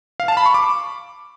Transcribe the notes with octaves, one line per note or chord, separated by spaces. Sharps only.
F5
A5
B5
C#6
D6